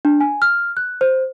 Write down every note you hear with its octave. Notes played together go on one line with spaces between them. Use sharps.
D4
G#5
F6
F#6
C5